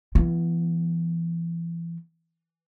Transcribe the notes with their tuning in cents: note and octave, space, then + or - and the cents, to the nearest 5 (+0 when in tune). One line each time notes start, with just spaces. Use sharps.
E3 +35 B3 +0